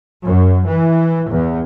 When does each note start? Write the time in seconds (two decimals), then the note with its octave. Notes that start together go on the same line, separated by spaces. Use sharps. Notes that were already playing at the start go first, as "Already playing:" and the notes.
0.24 F#2
0.66 E3
1.29 E2